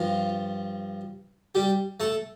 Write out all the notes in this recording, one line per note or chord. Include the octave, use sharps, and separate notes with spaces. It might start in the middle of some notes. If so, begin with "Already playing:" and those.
Already playing: G2 F3 F4
G3 G4
A3 A4